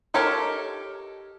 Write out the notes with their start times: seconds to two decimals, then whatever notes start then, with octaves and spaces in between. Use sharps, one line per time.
0.14 D#4 G4 A4 A#4 C#5